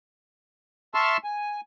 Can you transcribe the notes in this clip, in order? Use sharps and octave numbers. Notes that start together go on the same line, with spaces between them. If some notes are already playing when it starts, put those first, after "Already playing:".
E5 A5 C6 C#6 E6 F6
G#5